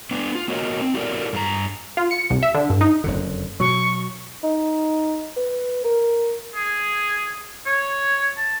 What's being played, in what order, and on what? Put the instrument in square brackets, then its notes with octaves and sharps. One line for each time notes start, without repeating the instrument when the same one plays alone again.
[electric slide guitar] B3 D4
F4
A#3 B3 F#4 A#4 C#5 D#5
C4
E4 F#4 G4 A4 A#4 D5
G2 G4 A#5
[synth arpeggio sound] F4
C#7
C2
E5
D3
G2
D#4
[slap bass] F#1 F2 D3
[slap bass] B2 F#3 [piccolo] C#6
[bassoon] D#4
B4
A#4
[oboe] G#4
C#5
A5